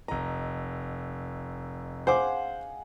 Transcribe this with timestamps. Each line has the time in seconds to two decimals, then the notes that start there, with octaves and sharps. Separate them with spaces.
0.08 F1 D#5 A#5
2.07 G#4 C5 F5 F#5 D6